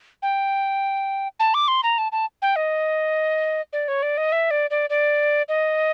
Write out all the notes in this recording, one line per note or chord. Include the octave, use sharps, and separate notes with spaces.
G5
A5
D6
C6
A#5
A5
A5
G5
D#5
D5
C#5
D5
D#5
E5
D5
D5
D5
D#5